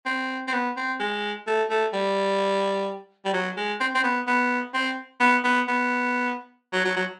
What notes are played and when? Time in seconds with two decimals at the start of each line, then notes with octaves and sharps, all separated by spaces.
0.06 C4
0.47 C4
0.53 B3
0.76 C4
1.00 G#3
1.47 A3
1.70 A3
1.93 G3
3.25 G3
3.33 F#3
3.57 G#3
3.80 C4
3.95 C4
4.04 B3
4.27 B3
4.74 C4
5.20 B3
5.44 B3
5.68 B3
6.73 F#3
6.84 F#3
6.96 F#3